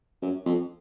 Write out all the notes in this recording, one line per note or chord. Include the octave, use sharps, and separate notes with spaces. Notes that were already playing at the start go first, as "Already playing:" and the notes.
F#2
F2